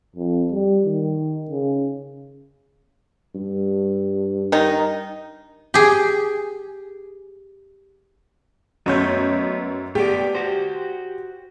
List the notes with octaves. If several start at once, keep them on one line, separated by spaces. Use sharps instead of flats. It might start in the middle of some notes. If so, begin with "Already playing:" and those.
F2
G3
D#3
C#3
G2
D#3 D#4
G4 G#4
F#2 A3 B3 C#5 D#5 G6
A3 B3 G4 D5
F#4 C5